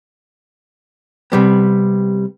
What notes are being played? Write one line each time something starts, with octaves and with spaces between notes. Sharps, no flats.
C3 G3 B3